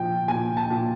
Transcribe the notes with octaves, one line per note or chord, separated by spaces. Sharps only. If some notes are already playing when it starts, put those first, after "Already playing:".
Already playing: A#2 F3 G5
A#2 G#5
A5
A#2